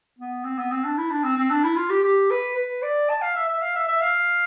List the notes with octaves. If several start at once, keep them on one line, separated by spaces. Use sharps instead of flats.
B3
C4
B3
C4
D4
E4
D4
C4
C4
D4
E4
F4
G4
G4
B4
B4
D5
A5
F5
E5
E5
F5
E5
E5
F5